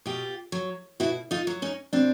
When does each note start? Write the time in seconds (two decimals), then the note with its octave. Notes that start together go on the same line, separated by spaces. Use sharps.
0.06 B2 F4 G4
0.52 F#3
1.00 B2 E4 F#4
1.31 D#4 F4
1.47 F#3
1.62 C#4 D#4
1.93 B2 C4 D4